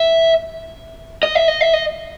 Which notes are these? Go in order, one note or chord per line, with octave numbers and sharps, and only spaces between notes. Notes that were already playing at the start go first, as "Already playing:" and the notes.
Already playing: E5
D#5
E5
D#5
E5
D#5